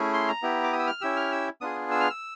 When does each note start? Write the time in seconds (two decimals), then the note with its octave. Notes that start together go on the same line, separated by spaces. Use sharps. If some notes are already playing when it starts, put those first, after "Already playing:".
Already playing: A3 C#4 E4 G#4
0.13 C6
0.28 A#5
0.42 B3 E4 G4
0.63 D6
0.73 D#6
0.79 E6
0.87 F6
1.01 C#4 E4 G4 E6
1.17 F6
1.32 E6
1.61 B3 D4 F4 G#4 D#6
1.91 E6
2.00 F6
2.10 E6